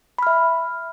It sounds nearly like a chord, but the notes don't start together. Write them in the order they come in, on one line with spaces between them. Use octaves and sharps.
B5 F6 E5